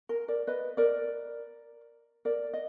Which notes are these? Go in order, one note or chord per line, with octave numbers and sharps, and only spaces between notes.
A#4
A#4 D5
B4 D#5
A#4 D5
A#4 D5
D#5